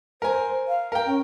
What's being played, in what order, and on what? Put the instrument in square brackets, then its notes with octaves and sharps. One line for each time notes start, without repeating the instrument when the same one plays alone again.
[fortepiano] A#4 G#5 [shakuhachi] C5
[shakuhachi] F5
[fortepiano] A#4 G5
[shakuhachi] C#4